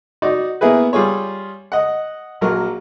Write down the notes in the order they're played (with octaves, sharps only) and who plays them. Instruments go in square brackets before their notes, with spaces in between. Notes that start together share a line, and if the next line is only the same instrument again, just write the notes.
[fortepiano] D#4 F#4 D5
A#3 B3 E4 G#4 B4
G3 F4 G#4 C#5
D#5 F#5
A#1 F#3 A#4